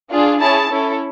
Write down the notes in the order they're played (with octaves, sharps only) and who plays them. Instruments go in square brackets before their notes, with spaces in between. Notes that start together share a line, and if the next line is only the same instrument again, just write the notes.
[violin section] D4 F4 G#4
C#4 E4 G#4 A5
C#4 E4 A4